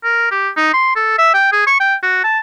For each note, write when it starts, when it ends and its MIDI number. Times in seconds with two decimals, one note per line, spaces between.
0.04 0.31 70
0.31 0.49 67
0.57 0.71 63
0.73 0.92 84
0.96 1.15 69
1.18 1.30 76
1.34 1.49 79
1.52 1.64 68
1.67 1.79 85
1.80 1.95 79
2.03 2.21 66
2.24 2.39 81